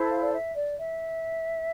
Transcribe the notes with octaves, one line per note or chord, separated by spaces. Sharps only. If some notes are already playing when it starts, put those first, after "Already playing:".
Already playing: E4 A4 C5
F5
D5
E5
D5
E5